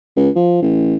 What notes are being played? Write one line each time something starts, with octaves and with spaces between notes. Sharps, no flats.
C#2
F3
A1